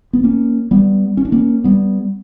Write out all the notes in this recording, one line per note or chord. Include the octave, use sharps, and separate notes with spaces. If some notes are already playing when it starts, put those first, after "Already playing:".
B3
A#3 C#4
G3 B3
C#4
D4
A#3 C#4
G3 B3